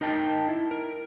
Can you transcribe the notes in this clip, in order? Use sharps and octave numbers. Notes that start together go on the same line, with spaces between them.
D#4 A#4 D#5 G5 A5
E4
A#4